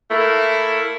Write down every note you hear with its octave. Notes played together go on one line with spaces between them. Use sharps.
A3 A#3 E4